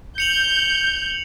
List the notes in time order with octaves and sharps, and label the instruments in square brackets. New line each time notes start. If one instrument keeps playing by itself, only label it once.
[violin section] G6 [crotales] C#7 F7 F#7